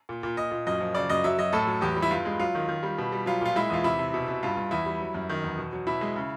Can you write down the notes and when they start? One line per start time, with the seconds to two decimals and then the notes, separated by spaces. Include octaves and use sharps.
0.09 A#2
0.23 A#2
0.37 A#2 D#5
0.51 A#2
0.67 F#2 D#5
0.80 F3
0.95 C#3 D5
1.09 F#2 D#5
1.24 F#3 E5
1.38 F#3 D#5
1.53 A2 A4
1.67 F#3
1.81 E2 G4
1.96 G3
2.02 E4
2.10 G2 F4
2.25 G#3
2.39 F#3 F4
2.55 D#3
2.69 D#3
2.83 G3
2.98 B2
3.12 G3
3.26 F#3 F4
3.41 A#2 F4
3.56 G#3 E4
3.70 E2 F4
3.84 C3 E4
3.99 C3
4.14 B2
4.28 B2
4.43 G2 F4
4.57 G2
4.71 E2 E4
4.86 G3
5.01 F#3
5.14 F#2
5.29 D#3
5.43 E2
5.58 B2
5.73 F#3
5.87 B2 E4
6.01 G#3
6.16 C#3